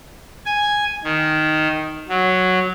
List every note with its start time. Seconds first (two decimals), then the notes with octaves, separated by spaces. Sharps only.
0.46 G#5
1.04 D#3
2.09 F#3